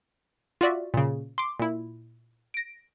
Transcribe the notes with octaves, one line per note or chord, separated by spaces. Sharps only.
F4 F#4 D5 E5
A#2 C#3
C6 D6
A#2 E4
A#6 D7